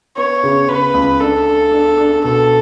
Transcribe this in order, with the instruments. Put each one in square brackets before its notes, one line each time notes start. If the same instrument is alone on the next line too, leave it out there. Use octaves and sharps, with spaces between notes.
[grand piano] B3 [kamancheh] C#5
[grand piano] C#3
[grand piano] C#3 [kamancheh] B4
[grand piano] C#2
[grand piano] D4 [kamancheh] A4
[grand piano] D4
D4
D4
[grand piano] B2 [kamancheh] A4